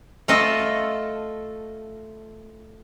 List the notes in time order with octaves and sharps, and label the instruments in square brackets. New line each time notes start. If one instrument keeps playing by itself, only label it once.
[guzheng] A3 F4 A4 D#5 A5